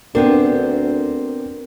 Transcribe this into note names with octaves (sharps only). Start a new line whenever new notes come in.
D2 B3 C4 D4 A#4